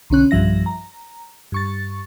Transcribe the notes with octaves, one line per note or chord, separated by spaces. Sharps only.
B1 D3 C#4 F#6
B1 G2 F3 E5 A#6
A#5
G2 C#6 A6